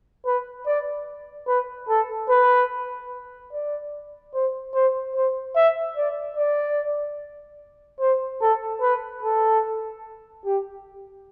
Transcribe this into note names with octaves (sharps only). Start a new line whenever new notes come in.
B4
D5
B4
A4
B4
D5
C5
C5
C5
E5
D5
D5
C5
A4
B4
A4
G4